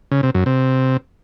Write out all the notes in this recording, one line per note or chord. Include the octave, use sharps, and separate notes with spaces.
C#3
C3
F#2
C3